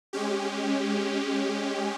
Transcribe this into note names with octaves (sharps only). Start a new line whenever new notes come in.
G#3 C#4 G4